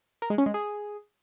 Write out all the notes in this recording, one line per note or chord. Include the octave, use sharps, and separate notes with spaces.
A#4
G#3
C#4
G#3
G#4